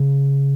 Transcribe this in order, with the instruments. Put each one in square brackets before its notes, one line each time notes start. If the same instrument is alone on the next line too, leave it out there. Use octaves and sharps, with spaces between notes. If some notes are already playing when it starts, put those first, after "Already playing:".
Already playing: [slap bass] C#3